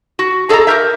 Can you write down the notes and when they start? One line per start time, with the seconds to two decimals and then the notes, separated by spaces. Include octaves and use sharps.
0.19 F#4
0.49 G#4 A4 D5 D#5 A#5
0.67 G4 A#4 E5